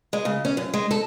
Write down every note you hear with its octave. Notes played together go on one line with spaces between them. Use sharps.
G#3
C#3
C#4
F#2
G#3
A4